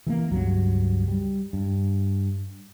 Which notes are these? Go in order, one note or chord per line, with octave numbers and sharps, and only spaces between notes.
E3 G3 A#3
C#2 G2 F#3
G3
G2